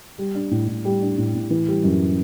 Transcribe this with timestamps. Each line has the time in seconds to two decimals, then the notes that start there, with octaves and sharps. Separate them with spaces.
0.18 G3
0.35 D4
0.51 A2
0.68 A2
0.85 G3
1.02 D4
1.18 A2
1.35 A2
1.50 E3
1.68 G3
1.84 F#2